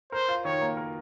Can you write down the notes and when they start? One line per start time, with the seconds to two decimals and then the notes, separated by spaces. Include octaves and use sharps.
0.12 A#4 C5
0.28 F4
0.45 D#3 C#5
0.61 A#3
0.77 A#4